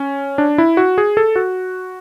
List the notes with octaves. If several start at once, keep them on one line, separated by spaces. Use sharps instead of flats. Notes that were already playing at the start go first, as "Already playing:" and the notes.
Already playing: C#4
D4
E4
F#4
G#4
A4
F#4